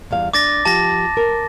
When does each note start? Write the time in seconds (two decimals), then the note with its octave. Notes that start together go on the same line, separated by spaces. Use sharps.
0.11 E2 G3 F5
0.33 D4 D6 A6 A#6
0.65 F3 G4 A5 A#6
1.17 A#4